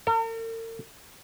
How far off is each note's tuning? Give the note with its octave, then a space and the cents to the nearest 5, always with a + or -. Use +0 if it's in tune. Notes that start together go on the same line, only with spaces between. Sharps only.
A#4 -45